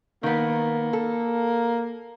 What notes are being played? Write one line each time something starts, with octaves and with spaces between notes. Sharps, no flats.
D#3 A#3 B3
A4